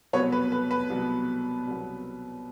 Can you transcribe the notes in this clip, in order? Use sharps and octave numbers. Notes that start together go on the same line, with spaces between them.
C2 B2 F#3 B3 B4 C#5
B4
B4
B4
C2 B2 F#3 B3
C2 B2 F#3 B3